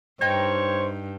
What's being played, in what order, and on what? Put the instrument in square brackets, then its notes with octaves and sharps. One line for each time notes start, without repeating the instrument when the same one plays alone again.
[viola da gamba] G2 [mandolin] D#4 G5 [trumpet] C5 [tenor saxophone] C#5